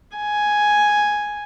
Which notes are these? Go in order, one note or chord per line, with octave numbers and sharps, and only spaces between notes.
G#5